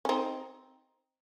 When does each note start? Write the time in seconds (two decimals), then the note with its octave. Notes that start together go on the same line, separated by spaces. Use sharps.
0.05 C#4
0.09 C4 D#4